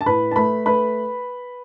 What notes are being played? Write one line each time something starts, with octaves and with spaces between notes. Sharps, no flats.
A5
A2 B4 B5
A5
A3 B4 B5
A3 B4 B5